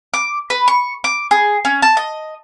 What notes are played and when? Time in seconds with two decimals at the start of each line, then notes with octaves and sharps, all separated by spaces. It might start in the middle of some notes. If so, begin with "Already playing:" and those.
0.14 D6
0.50 B4
0.68 C#6
1.04 D6
1.31 G#4
1.65 C#4
1.82 A5
1.97 D#5